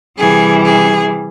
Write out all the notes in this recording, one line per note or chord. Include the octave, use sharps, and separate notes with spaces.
C3 E3 G3 G#4
G#4